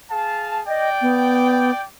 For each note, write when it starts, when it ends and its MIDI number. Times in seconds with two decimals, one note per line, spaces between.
0.11 0.61 68
0.11 0.61 77
0.11 0.61 81
0.68 1.85 74
0.68 0.89 75
0.68 1.85 79
1.02 1.71 59